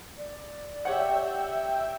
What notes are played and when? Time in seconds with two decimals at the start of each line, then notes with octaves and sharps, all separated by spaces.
0.18 D5
0.85 G4 C#5 E5 F#5 G5